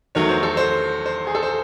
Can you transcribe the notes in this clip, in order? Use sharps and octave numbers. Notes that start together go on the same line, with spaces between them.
E2 D#3 F#3 A3 C#5
C5
A4
C5
C5
G#4
A4
C5